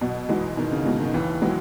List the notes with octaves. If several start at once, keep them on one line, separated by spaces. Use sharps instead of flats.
B2 F#3
E3 G#3 D#4 F#4
B2 D#3
C#3
B2 G#3 D#4 F#4
D#3
D#2 E3
D#3 F#3 G#3 B3